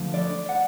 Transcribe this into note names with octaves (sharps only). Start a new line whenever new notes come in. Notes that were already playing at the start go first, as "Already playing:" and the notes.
Already playing: D2 D3 F3
D5
F#5